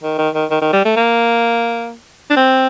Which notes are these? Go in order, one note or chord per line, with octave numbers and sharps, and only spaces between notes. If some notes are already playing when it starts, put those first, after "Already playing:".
D#3
D#3
D#3
D#3
D#3
G3
A3
A#3
D4
C4